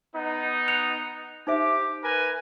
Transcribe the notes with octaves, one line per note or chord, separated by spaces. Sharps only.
B3 D#4
F#6 C#7 F7
D#4 G4 C5 E5 D6
A#4 B4 G#5